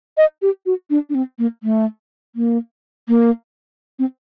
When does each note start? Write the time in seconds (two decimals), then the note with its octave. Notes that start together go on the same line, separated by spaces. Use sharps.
0.18 D#5
0.42 G4
0.66 F#4
0.90 D4
1.10 D4
1.15 C4
1.39 A#3
1.63 A3
2.36 A#3
3.08 A#3
3.99 C4